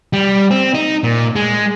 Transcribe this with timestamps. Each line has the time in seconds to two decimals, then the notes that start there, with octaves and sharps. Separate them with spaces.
0.13 G3
0.51 C4
0.74 D#4
1.04 A#2
1.36 G#3